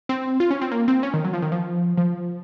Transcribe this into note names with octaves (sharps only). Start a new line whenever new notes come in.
C4
F4
C#4
C4
A#3
C4
C#4
D#3
F#3
F3
D#3
F3
F3